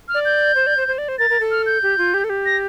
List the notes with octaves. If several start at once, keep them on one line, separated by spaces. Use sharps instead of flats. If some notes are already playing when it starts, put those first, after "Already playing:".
F6
D5
G6
C5
D5
C5
C5
D5
C5
A#4 A6
A#4
A4
F6
G6
G4
F4
G4
A4
G4
A#6